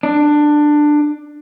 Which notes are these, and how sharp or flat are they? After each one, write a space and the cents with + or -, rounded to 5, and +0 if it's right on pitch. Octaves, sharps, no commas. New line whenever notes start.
D4 +15